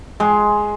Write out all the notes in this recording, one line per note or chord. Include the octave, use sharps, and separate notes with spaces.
G#3